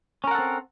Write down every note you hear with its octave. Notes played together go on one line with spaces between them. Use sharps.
C4 C#4 A4 A#4 F#5